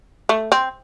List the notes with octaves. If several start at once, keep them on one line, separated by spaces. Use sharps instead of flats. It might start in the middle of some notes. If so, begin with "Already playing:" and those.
A3
C4